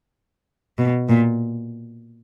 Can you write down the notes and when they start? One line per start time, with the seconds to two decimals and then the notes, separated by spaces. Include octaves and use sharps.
0.78 B2
1.09 A#2